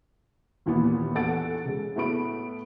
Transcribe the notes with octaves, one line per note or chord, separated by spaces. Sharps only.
D#2 A#2 E3 B3
E2 A4 F#5 A6 D7
C#3 G#3
A2 A3 B3 B5 D7